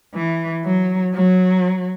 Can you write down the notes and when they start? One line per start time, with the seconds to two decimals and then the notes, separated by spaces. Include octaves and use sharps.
0.14 E3
0.64 F#3
1.14 F#3